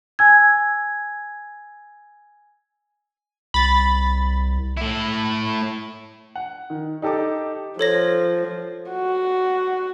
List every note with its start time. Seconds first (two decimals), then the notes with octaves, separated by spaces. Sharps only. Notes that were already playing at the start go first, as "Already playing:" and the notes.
0.19 G#5 E6 G#6
3.54 C2 B5 A6
4.77 A2 E4
6.35 F#5
6.70 D#3
7.02 D#4 G4 A4 A5 D6
7.79 F3 A4 C#5 A#6
8.91 F#4